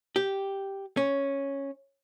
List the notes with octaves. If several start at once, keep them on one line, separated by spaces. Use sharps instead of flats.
G4
C#4